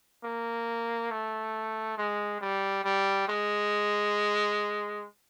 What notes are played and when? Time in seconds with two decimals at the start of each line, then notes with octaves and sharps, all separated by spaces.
0.24 A#3
1.11 A3
1.98 G#3
2.41 G3
2.85 G3
3.28 G#3